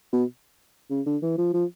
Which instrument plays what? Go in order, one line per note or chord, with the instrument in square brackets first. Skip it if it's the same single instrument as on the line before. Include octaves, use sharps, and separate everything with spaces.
[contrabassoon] B2
C#3
D3
E3
F3
F3